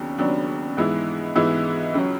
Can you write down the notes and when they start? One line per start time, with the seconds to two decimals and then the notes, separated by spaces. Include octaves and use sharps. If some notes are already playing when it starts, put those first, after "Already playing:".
Already playing: D#2 C#3 F#3 B3 D4
0.18 D#2 C#3 F#3 B3 D4
0.77 G#2 E3 G#3 B3 E4
1.35 G#2 E3 G#3 B3 E4
1.94 C#2 C#3 F#3